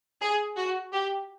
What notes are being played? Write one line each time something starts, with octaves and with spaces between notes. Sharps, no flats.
G#4
F#4
G4